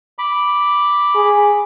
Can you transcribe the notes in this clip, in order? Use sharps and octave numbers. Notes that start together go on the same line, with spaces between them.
B5 D6
G#4